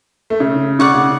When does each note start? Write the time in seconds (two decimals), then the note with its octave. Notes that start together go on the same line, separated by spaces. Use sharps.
0.30 A3
0.40 C#3
0.79 C#3 D5 F#5 C#6
0.94 C#3